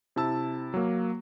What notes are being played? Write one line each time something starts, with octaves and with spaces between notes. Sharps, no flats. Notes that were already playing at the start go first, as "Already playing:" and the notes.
C3 E4 A5 E6
F#3 A#3